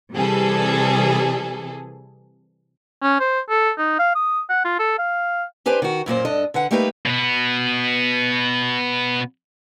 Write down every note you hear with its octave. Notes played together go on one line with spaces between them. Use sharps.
C3 E3 G3 G#4 A4
C#4
C5
A4
D#4
F5
D#6
F#5
F4
A4
F5
D4 G4 B4 C5 G#5
D#3 F#4
F#2 A#2 A#3 C5
G2 D4 A4 D#5
D3 B4 F#5
G3 A3 A#3 D#4 G4 B4
B2 B3